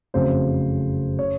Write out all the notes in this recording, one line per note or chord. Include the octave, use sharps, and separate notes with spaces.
F#1 F2 C#3 F#3 A3 C5
C#3 C#5